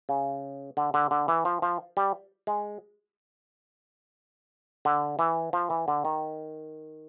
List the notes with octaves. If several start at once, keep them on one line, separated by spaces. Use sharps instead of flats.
C#3
D3
D3
D3
E3
F3
F3
G3
G#3
D3
E3
F3
E3
D3
D#3